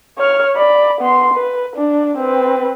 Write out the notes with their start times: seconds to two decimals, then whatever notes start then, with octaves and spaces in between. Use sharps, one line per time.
0.18 C#5 F6
0.56 D5 B5
1.01 B3 C6
1.34 B4
1.75 D4
2.18 C4 B4